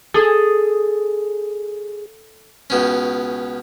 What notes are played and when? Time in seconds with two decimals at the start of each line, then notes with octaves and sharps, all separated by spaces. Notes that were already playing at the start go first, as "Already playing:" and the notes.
0.14 G#4 A4 D#6
2.70 C#2 B2 C#4